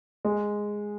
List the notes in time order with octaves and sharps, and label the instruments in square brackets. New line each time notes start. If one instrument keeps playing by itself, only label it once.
[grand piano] G#3